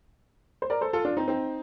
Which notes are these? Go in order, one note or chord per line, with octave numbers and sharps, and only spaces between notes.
C5
A#4 D5
A4 C5
F4 A4
D4 F4
C4 D#4
C4 D#4